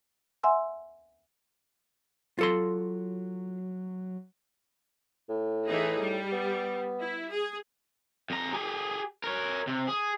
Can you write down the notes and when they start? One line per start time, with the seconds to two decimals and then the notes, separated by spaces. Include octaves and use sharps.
0.43 E5 F#5 G#5 C6 E6
2.39 F#3 F4 A4 C6
5.29 A2
5.66 E3 D#4 G#4
5.98 G3
6.32 B3
7.00 E4
7.32 G#4
8.30 F2 A#5
8.53 G4 G#4
9.24 A#4 C#5
9.67 C3
9.88 G#4